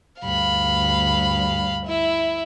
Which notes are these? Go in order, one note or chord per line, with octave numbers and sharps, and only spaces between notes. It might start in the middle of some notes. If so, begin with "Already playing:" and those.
D2 G2 F5 B5
E4 E5